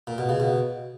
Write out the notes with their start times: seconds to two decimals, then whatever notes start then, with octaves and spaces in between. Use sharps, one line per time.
0.07 A#2
0.18 B2
0.29 C#3
0.40 B2